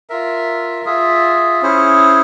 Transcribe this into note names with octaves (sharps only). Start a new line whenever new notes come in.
F4 A#4 E5
F4 G#4 E5
C#4 E4 G#4 C5